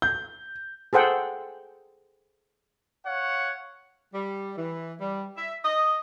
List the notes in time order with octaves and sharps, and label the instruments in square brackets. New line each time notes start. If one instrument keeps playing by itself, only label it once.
[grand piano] G6
[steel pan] G#4 A4 C5 F#5 G5
[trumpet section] C#5 F5 F#5
[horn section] G3
E3
G3
E5
D#5